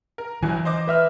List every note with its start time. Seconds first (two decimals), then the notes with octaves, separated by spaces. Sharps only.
0.18 A#4
0.43 G1 E3 F#3 G#5
0.65 C5 D#5 D6
0.87 B4 E5 F6